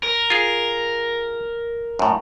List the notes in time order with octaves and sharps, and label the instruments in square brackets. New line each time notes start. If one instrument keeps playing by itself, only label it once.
[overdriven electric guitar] A#4
[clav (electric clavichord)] F4 G#4
F#2 A2